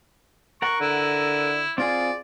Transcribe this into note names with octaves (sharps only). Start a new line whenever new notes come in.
A#4 F#5 C#6
D3 E4
C4 F4 G#4 D5